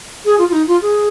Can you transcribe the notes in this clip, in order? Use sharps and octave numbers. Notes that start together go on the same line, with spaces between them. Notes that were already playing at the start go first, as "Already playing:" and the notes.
G#4
F4
F4
D#4
F4
G#4